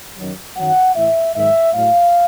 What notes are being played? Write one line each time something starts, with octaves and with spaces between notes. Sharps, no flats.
F#2 D#3 F#3
F#2 D#3 F#3 F#5
A2 E3 E5
G#2 D#3 F#3 E5
A2 F#3 F5